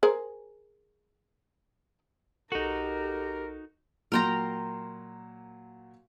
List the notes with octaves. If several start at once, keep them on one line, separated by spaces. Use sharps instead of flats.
G#4 A#4 C5
B1 D#4 F#4 G4 A4 A#4
A#2 F#3 A#4 G5 A#5 C6